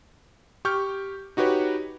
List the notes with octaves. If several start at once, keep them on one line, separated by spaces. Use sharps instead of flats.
G4 C#6 F6 G6
D#4 F#4 G4 B4 C#5